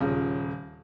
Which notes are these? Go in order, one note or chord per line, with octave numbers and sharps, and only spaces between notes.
D#1 C#3